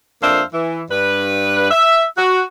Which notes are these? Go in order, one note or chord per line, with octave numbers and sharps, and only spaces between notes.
F2 A#3 D4 C5 E5 F5
E3
G2 B4
E5
F#4